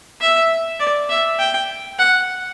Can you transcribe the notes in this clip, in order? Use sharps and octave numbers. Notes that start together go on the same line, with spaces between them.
E5
D5
E5
G5
F#5